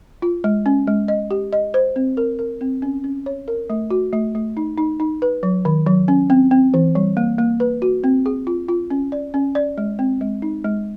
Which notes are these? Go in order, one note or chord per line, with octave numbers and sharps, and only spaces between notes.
F4
G#3
C#4
G#3
D#5
G4
D#5
C5
C4
A#4
A#4
C4
C#4
C#4
C#5
A#4
A3
F#4
A3
A3
D#4
D#4
D#4
B4
F#3
D#3
F#3
C#4
C4
C4
E3
G3
A#3
A#3
B4
F#4
C4
G#4
F4
F4
C#4
D5
C#4
D5
G#3
C4
G#3
D#4
G#3